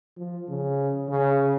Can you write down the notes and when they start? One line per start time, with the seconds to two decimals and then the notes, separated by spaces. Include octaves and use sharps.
0.17 F3
0.48 C#3
1.09 C#3